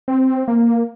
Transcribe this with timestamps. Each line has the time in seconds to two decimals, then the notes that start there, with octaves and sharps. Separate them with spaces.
0.08 C4
0.48 A#3